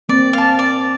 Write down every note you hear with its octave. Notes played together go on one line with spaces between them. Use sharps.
A#3 C4 D5
F5 A5
D5